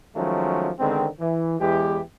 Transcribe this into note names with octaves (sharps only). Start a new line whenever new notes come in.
D#3 F3 F#3 G#3 A3 C#4
D3 D#3 G#3 B3 C4
E3
E2 E3 G#3 G4